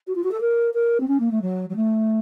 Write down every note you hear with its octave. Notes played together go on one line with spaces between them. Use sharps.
F#4
F4
F#4
A4
A#4
A#4
C4
C#4
A#3
A3
F#3
F#3
A3